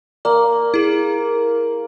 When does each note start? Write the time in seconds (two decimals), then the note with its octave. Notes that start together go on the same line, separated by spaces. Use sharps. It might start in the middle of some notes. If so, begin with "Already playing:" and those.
0.25 A#3 D5
0.74 E4 G#4